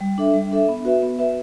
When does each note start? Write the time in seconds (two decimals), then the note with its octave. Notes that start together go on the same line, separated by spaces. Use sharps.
0.01 G3
0.18 D4 A4 E5
0.34 G3
0.52 D4 A4 E5
0.68 B3
0.85 F#4 B4 E5
1.02 B3
1.19 F#4 B4 E5